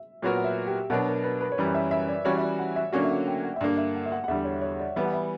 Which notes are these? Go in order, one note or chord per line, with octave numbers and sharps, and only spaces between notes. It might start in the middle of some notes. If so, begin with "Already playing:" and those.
Already playing: E5
A#2 F#3 B3 F#4 A#4
F#5
E5
G4
B2 F#3 B3 D4 A#4
A#4
B4
B4
C#5
F#2 E3 G3 D5
E5
E5
D5
E3 G3 C#4 F#4 C#5
E5
D5
F#5
E5
D3 F#3 A#3 C#4 F#4 D5
E5
F#5
G5
F#5
E5
G2 D3 A#3 D5
E5
F#5
E5
F#5
F#5
E2 D3 G3 E5
C#5
C#5
D5
E3 G3 B3 E5
F#5
E5